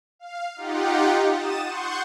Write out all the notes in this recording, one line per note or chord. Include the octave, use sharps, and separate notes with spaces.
F5
D#4 F4 G4 F#5
D#6 A6 E7
F#5 C6 C#6 G6